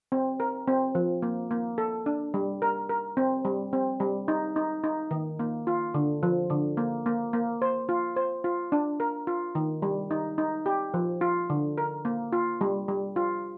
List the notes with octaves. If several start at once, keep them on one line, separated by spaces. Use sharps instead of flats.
C4
A#4
C4
F3
A#3
A#3
A4
D4
G3
A#4
A#4
C4
G3
C4
G3
D#4
D#4
D#4
D#3
A#3
F4
D3
F3
D3
A#3
A#3
A#3
C5
F4
C5
F4
D4
A#4
F4
D#3
G3
D#4
D#4
G4
F3
F4
D3
A#4
A#3
F4
G3
G3
F4